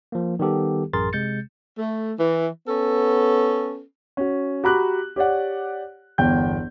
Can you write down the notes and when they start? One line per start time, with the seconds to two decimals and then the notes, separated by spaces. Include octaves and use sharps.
0.12 F3 A#3
0.39 D#3 G3 B3 G4 A4
0.93 A1 F#2 G#4 A#4 C6 A6
1.13 C3 G#3 G6 A6 C#7
1.78 A3
2.19 E3
2.68 B3 C#4 A4
4.17 C#4 F#4
4.64 F#4 G4 A#5 B5 D6 F#6
5.16 G4 C#5 D5 F#5
6.18 G1 E2 G5 G6